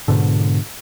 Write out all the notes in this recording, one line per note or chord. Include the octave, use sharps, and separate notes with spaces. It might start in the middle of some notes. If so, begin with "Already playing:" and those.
G#2 B2 D3